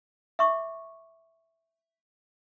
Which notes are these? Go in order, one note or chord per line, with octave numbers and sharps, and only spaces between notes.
E5 C#6 D6